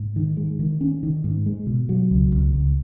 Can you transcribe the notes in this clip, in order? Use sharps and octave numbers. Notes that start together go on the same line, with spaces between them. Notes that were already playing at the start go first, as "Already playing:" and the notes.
Already playing: G#2
D#3
G#3
D#3
C#4
D#3
G#2
G#3
B2
F#3
C#2
C#2
C#2